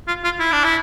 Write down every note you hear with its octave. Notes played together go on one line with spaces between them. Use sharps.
F4
F4
E4
D4
E4